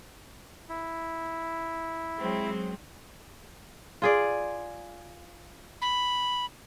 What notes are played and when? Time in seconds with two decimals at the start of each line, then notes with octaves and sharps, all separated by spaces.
0.69 E4
2.20 F#3 G#3 C4
4.02 F4 G#4 D5
5.82 B5